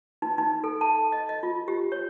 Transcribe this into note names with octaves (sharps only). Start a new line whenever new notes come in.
D#4
D#4
A4
A5
D#5
D#5
F4
G4
C#5